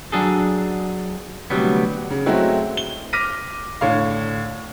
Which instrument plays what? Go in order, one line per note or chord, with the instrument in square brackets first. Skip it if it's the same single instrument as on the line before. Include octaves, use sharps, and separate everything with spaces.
[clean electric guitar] F#3 D4 G#4 A4
D2 G2 C3 F#3 G3 B3
[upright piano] C#3
F#3 G#3 A3 C4 E4 F#4
G7
D6 F6 A#6 B6 D#7
A2 D3 C#5 F5